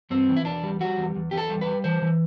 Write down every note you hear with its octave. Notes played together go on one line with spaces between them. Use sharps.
G2 C4
E3
E4
E2 D4
G3
G3 F#4
E2
E2
E2 G4
A4
G3
G3 B4
E3 C5
E3